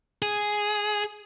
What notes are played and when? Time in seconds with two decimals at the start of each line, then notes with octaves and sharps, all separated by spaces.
0.22 G#4